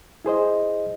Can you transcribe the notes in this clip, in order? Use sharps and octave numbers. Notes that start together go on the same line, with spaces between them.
E4 G#4 C5 D#5